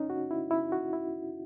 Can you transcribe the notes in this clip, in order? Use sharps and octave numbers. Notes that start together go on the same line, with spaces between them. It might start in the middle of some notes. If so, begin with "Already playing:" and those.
Already playing: C#4 D#4
F#4
E4
E4
F#4
E4